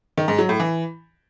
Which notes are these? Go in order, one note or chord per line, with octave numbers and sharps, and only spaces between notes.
D#3
G#2
F#3
A2
E3